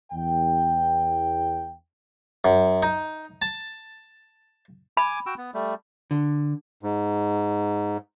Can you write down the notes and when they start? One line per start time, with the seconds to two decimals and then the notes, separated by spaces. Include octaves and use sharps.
0.12 E2 G5
2.45 F#2
2.83 D#4
3.42 A5
4.97 G#5 B5 D6
5.26 F#4 G5 E6
5.38 B3
5.54 G3 A3
6.11 D3
6.83 G#2